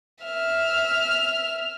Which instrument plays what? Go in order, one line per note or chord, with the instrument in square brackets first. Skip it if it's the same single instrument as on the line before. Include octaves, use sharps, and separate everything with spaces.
[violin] E5 F6